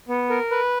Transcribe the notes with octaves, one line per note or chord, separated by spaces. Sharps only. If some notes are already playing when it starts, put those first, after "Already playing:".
B3
A#4
B4